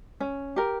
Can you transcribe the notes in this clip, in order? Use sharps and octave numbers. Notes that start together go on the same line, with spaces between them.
C#4
G4 A#4